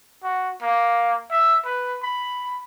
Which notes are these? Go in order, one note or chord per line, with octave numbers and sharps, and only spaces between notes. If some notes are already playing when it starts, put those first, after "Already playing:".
F#4
A#3
E5
B4
B5